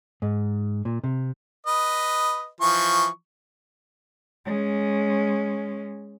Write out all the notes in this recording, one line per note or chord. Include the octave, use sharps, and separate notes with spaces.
G#2
A#2
C3
B4 D#5
E3 F3 C#6
G#3 C#4